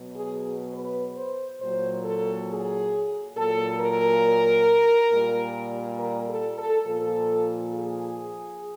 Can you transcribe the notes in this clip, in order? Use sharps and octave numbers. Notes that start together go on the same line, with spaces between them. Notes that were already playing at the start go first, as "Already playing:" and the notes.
Already playing: B2 F#3
G#4
B4
C5
A#2 F#3 C5
A4
G#4
A#2 F#3 A4
A#4
A#2 G3
A#4
A4
A4
A#2 F3 A4
G#4